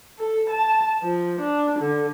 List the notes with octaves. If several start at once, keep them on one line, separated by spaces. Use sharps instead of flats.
A4
A5
F3
D4
D3